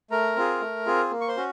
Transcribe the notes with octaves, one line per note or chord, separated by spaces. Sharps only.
A3 A#4 A#5
C4 F4 G#4
A3
C4 F4 G#4
A#3
C#6
C5 C6
C#4 F#4